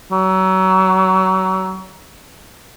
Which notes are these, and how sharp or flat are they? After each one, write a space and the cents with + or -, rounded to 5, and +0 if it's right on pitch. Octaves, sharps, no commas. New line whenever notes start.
F#3 +30